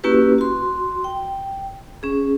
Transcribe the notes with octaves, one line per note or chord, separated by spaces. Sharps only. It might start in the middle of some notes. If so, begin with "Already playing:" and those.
A#3 C#4 E4 F#4 G4 B4
F#4 C6
G5
C#4 G#4